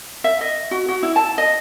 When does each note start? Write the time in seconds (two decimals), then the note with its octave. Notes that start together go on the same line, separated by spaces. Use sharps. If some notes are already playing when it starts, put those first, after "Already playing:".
0.24 E5
0.41 D#5
0.71 F#4
0.88 F#4
1.03 E4
1.16 A5
1.38 D#5